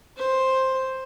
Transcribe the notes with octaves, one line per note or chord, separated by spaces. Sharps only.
C5